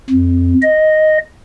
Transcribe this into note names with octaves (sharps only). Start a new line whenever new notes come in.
F2
D#5